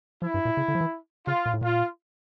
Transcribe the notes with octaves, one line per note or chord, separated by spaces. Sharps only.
F3 E4
G2
A#2
C#3
D3
F3
E3
C#3 F4
A#2
A2
A#2 F4